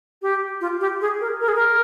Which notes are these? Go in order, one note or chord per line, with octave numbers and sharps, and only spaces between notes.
G4
F4
G4
G#4
A#4
A#4
G#4
A#4